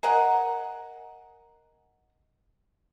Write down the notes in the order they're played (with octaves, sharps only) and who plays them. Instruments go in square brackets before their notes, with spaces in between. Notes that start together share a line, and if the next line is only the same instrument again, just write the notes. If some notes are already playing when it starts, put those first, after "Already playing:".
[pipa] G#4 A#4 D#5 F#5